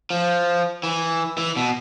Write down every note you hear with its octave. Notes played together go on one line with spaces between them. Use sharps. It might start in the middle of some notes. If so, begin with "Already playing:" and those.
F3
E3
E3
B2